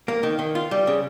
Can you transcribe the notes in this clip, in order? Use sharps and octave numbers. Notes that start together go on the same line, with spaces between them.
A#3
D#3
D#3
F4
G3
C#3